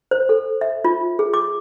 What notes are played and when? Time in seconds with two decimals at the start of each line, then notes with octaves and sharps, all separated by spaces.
0.11 C5
0.29 A4
0.61 E5
0.85 F4
1.19 G#4
1.34 D6